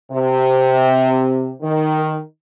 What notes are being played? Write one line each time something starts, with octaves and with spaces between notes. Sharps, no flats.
C3
D#3